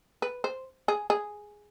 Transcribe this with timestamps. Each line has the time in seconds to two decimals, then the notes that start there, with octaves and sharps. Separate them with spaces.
0.22 B4
0.44 C5
0.88 G#4
1.10 G#4